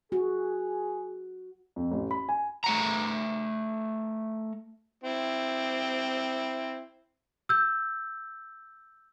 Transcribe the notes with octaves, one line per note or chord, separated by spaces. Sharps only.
F#4 G#4
F2
A1
B5
G#5
A3 F#5 A#5
C4 E4
E6 G6